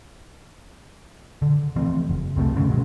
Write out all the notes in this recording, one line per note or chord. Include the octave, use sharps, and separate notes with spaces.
D3
E3 F3 A3 C4
F#1
C#2 C3 F#3 A3
G2 D3 B3 C#4
B2 D#3 F#3 G#3